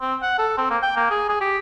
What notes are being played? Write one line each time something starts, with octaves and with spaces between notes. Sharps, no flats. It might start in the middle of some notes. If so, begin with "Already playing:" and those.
C4
F#5
A4
C4
A#3
G5
A#3
G#4
G#4
G4